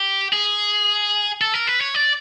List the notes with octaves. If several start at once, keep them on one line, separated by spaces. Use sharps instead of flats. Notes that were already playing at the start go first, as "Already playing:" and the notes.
Already playing: G4
G#4
A4
A#4
B4
C#5
D5